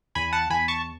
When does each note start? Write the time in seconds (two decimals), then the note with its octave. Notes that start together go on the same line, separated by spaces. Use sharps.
0.15 E2 G#5 B5
0.33 F#5 A5
0.50 E2 G#5 B5
0.68 A5 C#6